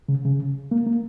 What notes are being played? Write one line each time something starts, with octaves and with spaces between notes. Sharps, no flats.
C#3
C#3
A#3
A#3